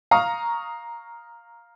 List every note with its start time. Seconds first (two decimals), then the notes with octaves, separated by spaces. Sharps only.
0.11 F5 A#5 C#6 D#6